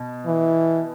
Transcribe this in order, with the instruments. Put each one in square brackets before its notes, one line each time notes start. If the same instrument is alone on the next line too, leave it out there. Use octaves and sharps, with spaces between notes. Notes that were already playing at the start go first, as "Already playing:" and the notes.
Already playing: [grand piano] B2
[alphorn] E3